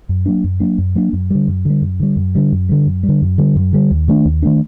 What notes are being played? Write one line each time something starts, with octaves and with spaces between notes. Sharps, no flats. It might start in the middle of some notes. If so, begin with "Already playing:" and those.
F#2
F#3 A#3 D4
F#2
F#3 A#3 D4
F#2
F#3 A#3 D4
F#2
D3 G3
F#2
D3 G3
F#2
D3 G3
F#2
D3 G3
F#2
D3 G3
F#2
G3
D3
F#2
D3 G3
F#2
D3 G3
D#2
D#3 A3 D4
D#2
D#3 A3 D4